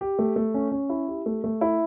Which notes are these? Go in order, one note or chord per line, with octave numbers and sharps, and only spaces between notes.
G4
A3
A3
C#4
C#4
E4
G4
A3
A3
E4